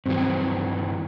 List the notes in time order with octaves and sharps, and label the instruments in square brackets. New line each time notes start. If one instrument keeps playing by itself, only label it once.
[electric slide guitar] G2 D#3 E3 [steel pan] F#3 C4